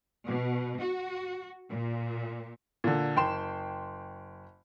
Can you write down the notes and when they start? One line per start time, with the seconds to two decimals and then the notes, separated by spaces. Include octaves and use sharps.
0.27 B2
0.81 F#4
1.70 A#2
2.84 A#2 D3
3.16 F#1 G5 C6 E7